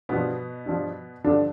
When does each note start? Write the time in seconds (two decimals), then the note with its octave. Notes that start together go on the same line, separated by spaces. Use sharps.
0.09 G2 B2 F3 B3
0.66 G2 F3
1.24 G2 D3 F3 D4